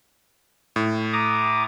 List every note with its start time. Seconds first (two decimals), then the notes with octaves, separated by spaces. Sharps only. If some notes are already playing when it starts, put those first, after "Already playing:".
0.76 A2
1.13 A#5 D6 D#6